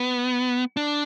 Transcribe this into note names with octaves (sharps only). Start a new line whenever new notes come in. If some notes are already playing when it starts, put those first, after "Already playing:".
Already playing: B3
D4